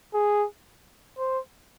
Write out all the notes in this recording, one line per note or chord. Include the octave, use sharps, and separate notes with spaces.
G#4
C5